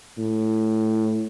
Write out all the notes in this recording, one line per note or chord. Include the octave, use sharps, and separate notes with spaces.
A2